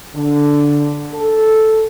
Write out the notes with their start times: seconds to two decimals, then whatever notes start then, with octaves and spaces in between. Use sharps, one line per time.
0.15 D3
1.13 A4